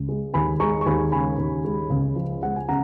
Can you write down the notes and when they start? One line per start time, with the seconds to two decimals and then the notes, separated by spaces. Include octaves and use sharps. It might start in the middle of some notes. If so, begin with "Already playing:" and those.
Already playing: C#2
0.09 G#3
0.34 D#2 G#5 B5
0.60 G#3 A#5 C#6
0.81 C#6
0.86 D#2 G#5 B5
1.12 C#3 G#5 B5
1.38 D#2
1.65 G#3
1.90 C#2
2.16 F3
2.43 G#3 F#5
2.56 G#5
2.68 C#3 F#5 A#5